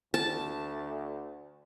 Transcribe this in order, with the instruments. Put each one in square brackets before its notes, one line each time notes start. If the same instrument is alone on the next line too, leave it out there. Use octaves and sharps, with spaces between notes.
[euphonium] D2 [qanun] A5